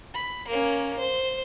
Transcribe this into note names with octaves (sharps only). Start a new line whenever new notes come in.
B5
A#3 C#4
C5